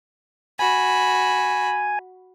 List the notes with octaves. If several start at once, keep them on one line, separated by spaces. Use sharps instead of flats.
F#4 G#5 B5